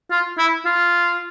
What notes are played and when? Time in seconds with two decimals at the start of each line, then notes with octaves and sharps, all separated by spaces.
0.11 F4
0.38 E4
0.66 F4